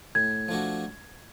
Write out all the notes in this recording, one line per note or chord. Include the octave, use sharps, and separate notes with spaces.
A2 G#6
F3 A3 D4 F#4